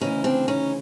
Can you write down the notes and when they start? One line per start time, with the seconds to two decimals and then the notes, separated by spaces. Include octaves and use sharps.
0.01 D2 C#3 E3 C#4 D#4
0.24 C4 D4
0.48 C#4 D#4